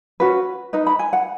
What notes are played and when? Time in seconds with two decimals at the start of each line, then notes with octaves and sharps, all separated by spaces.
0.20 C#4 F#4 B4
0.73 D#4 B4 D#5
0.87 B5
0.99 G#5
1.13 F#5